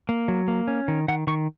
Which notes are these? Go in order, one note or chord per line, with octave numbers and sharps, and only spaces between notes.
A#3
F#3
A#3
C#4
D#3
D#3 F#5
D#3 C#6